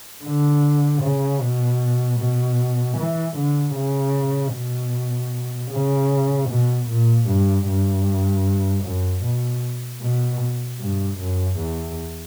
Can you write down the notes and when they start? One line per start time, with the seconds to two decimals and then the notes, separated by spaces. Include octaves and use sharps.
0.24 D3
1.02 C#3
1.40 B2
2.19 B2
2.98 E3
3.36 D3
3.76 C#3
4.54 B2
5.71 C#3
6.49 B2
6.89 A#2
7.28 G2
7.67 G2
8.84 F#2
9.23 B2
10.01 B2
10.80 G2
11.19 F#2
11.58 E2